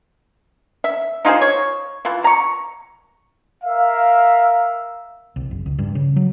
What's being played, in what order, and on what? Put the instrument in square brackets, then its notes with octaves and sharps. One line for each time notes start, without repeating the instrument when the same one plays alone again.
[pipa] E5
D#4 F4 G#4 C5
C#5
E3 F4 B4
A#5 C#6
[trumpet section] A#4 E5 F5
[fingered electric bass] C2
F#1
C#2
G2
C#3
F#3